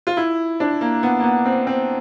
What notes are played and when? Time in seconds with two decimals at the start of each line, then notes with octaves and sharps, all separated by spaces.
0.07 F4
0.17 E4
0.60 D4
0.81 A#3
1.03 B3
1.20 A#3
1.24 B3
1.46 C4
1.67 C4